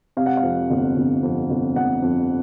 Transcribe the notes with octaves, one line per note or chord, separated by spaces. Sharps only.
C3 F5
F#5
F5
F2
G1
G1
F2
G1
G1 F#5
F2